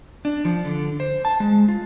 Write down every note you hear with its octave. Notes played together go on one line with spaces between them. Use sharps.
D4
F3
D3
C5
A5
G#3
F4